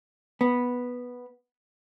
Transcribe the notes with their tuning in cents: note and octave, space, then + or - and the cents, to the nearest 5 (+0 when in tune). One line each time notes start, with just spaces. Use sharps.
B3 -5